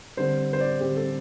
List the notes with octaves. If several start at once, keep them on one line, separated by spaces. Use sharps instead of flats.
D3 G3 C4 C5
C5
D5
D3 G3 C4 G4
A4